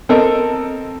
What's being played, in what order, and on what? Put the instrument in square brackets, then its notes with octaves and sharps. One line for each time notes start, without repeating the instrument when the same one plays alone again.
[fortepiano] C4 A4 A#4 D#5